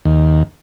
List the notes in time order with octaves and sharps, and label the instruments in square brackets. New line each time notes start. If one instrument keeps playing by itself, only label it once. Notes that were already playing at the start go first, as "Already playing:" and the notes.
[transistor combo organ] D#2